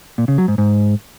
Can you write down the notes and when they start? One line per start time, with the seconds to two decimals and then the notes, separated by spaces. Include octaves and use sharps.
0.18 A#2
0.28 C#3
0.38 F#3
0.48 G#2
0.58 G#2